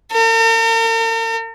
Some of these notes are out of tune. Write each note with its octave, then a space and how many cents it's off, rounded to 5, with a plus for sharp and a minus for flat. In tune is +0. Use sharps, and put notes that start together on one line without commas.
A#4 -45